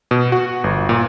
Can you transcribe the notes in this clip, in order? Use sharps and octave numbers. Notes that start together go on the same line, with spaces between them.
B2
F#4
G1
A#2